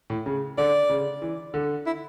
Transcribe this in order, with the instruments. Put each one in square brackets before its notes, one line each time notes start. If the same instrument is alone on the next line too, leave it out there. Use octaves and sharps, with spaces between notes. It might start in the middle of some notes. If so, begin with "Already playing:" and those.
[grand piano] A2
C#3
[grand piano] D3 [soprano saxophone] D5
[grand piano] C#3
E3
D3
[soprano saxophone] E4